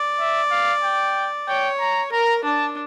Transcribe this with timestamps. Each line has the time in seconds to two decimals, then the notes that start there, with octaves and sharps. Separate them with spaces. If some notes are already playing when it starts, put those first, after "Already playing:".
Already playing: D5
0.19 E5
0.51 F5
0.83 G5
1.48 C#5 G5
1.79 A#5
2.12 A#4 A#5
2.44 D4 A5